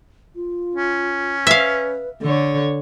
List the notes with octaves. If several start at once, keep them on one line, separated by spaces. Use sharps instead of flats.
F4
C#4
B4 E5 F5
D3 A4 C#5